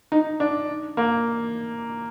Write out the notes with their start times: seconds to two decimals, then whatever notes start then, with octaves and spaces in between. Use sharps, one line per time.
0.12 D#4
0.40 D4
0.97 A#3